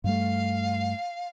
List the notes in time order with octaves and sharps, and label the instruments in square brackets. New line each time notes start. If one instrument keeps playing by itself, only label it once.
[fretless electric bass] G2 G3 A3 [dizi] F5